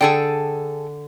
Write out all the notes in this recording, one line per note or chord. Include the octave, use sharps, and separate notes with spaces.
D3 G#4 A4 G5